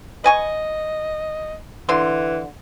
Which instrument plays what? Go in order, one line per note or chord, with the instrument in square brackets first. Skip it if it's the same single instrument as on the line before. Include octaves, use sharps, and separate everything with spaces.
[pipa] B4 G#5 C#6 [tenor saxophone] D#5
[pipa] D3 C6 [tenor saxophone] E3